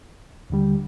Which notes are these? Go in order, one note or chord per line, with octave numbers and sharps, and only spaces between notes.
D#2 D3 G3